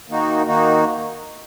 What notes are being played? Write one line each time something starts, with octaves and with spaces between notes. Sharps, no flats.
D#3 A#3 D#4 F#4
D#3 A#3 D#4 F#4